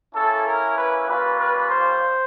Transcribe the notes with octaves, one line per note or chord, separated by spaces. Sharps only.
A#3 C#4 E4 A4
A#4
B4
G3 A#3 C#4 F4 B4
B4
C5